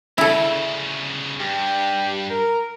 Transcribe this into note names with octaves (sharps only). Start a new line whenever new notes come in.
D2 C#3 E4 A4
G2 G4
A#4